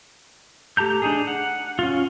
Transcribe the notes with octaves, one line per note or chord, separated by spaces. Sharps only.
A3 G4 A5 A#5 G6
D4 D#4 G#4
F#5
C#4 F4